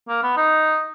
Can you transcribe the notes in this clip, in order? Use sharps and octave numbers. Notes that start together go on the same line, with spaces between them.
A#3
B3
D#4